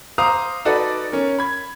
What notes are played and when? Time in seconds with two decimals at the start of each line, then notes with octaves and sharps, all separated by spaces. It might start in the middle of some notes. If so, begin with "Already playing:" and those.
0.18 C5 F5 A#5 D6 D#6
0.65 D#4 F#4 A4 B4 D5
1.12 C#4 A#4
1.38 B5 G#6